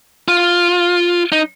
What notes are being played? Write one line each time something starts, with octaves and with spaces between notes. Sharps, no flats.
F4
D#4